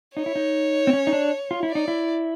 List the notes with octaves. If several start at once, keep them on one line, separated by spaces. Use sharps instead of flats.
D#4 C#5
E4
D#4
C4
C#4
D#4
D4
F4
E4
D#4 D5
E4